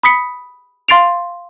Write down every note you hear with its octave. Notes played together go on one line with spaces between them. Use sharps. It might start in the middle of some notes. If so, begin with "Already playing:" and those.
B5 D#6 B6 C#7
F5 C6 A6 C7 D7 F7